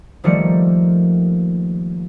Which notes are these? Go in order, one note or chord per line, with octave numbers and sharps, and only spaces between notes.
D#3 F3 G3 A3 A#3 C#7